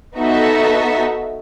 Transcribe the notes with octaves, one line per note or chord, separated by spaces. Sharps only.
B3 D#4 F#4 A4 E5